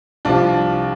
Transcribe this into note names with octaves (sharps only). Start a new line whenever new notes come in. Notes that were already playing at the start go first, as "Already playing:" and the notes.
C2 C3 F3 D4 F4